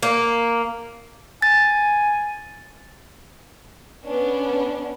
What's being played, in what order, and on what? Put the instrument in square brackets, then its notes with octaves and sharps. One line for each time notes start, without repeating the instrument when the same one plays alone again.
[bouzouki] A#3
[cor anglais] G#5 [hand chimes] A6
[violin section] B3 C#4 D4